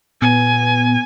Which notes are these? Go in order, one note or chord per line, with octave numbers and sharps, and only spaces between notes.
A#2 B3 G#5